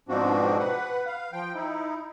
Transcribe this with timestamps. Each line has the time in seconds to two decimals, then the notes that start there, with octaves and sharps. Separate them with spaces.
0.09 G#2 B2 F3 C4 D4 F#4
0.59 B4 F#5
1.06 F5
1.33 F3 G5
1.55 D#4 E4